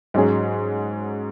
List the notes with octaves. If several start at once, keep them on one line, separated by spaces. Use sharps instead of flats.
G#2 F#3 C#4 G#4